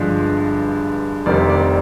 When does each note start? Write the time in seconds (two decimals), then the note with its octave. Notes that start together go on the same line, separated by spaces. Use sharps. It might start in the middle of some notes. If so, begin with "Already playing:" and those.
Already playing: G1 G2 D3 F3 G#3
1.26 F1 F2 D#3 G3 D5
1.50 D5